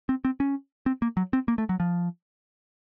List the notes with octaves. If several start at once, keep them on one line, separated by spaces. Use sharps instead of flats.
C4
C4
C#4
C4
A#3
F#3
C4
A#3
A3
F#3
F3